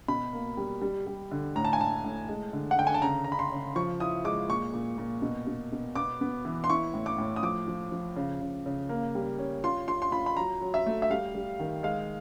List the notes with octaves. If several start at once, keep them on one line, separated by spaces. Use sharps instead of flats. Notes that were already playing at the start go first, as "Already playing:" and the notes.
B2 B5
A#3
G3
G3
G3
D3
A2 A#5
A5
G#5
A2 A5
A2
G#3
D3
F#5
D3 G5
G#5
A5
C#3 A#5
C#3 A#5
B5
C6
C#3
F3 C#6
E4 D#6
G#3 D6
A#2 C#6
A#2
A#2
B2
B2
B2
B3 D6
B3
E3
C6
E4 C#6
A2
D6
A2
D#6
F3 D6
F3
F3
C#3
C#3
C#3
A#3
G3
C#4
F4 C6
F4 C6
C6
F4 B5
B5
F#3 A#5
F#3
E5
A3
E5
G3 F5
G3
D#3
G#3 F5